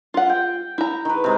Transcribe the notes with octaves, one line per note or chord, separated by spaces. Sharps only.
F4 F#5
G5
E4 A#5
D#3 B4
C3 G#3